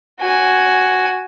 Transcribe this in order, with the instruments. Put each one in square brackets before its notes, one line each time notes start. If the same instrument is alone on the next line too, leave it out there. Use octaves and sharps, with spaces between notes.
[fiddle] F#4 G#5